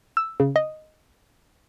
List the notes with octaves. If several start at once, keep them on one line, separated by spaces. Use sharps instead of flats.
E6
C#3
D#5